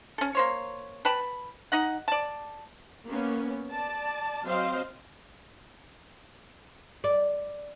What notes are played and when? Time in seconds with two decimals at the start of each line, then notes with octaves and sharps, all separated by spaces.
0.18 C#4 A4
0.35 A#3 C5 C#5
1.05 B4 G5 A5 B5
1.72 D#4 D#5 F#5
2.08 D5 A5
3.07 A#3 B3 C#4
3.71 D5 A5
4.45 F#3 C4 C5 D#5 F5
7.04 D5